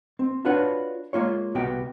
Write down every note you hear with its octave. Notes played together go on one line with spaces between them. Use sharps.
C4
D4 F4 F#4 B4 C#5 F#5
G#3 A#3 F4 C#5
C2 B2 B3 F#4 G4 G5